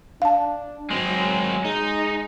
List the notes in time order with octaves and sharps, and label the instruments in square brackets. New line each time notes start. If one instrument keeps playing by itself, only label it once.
[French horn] D4 [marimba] F5 A5
[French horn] F#3 [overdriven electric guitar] G#3 C4
[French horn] G#3 [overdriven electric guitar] D#4